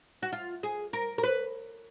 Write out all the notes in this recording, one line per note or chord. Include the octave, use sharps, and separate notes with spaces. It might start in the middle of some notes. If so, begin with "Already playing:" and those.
F#4
F4
G#4
A#4
A#4
B4